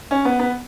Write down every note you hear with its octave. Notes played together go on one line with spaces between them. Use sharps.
C#4
B3
B3